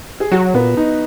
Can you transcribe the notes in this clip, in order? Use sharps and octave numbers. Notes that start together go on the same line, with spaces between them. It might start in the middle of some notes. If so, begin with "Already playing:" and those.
G#4
F#3 F#4
A#2 B3
D#4